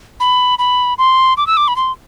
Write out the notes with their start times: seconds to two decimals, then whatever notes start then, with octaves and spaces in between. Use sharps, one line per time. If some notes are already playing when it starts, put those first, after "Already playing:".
0.20 B5
0.59 B5
0.98 C6
1.37 D6
1.47 E6
1.57 D6
1.68 B5
1.76 C6